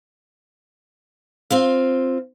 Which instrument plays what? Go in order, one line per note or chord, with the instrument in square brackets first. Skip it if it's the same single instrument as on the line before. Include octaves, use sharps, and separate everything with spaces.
[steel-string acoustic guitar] C4 F4 F5